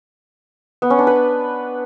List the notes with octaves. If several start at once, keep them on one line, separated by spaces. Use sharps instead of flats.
B3
C#4
D4
B4